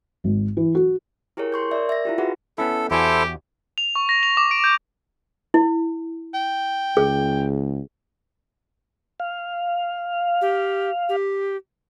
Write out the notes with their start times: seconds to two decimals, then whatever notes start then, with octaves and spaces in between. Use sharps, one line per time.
0.24 G#1
0.57 E3
0.75 F#4
1.37 E4 G4 G#4 A#4 C#5
1.52 C6 C#6 G6
1.71 A#4 D5 E5
1.89 E5 A#6
2.05 E4 F4 G4
2.18 F4 F#4 G#4 B4 F#5
2.58 B3 C#4 E4 A4
2.91 E2 E4 F#4 G4 A4 C5 G#5
3.78 F7
3.95 C#6
4.09 A#6
4.23 F7
4.37 D6
4.51 D7
4.64 G6
5.54 E4
6.34 G5
6.97 C#2 G#4
9.20 F5
10.41 G4
11.09 G4